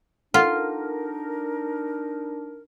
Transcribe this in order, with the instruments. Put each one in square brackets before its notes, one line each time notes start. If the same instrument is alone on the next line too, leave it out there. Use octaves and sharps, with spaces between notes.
[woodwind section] D4 D#4 A#4 [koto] F4 [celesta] A4 F#5 F6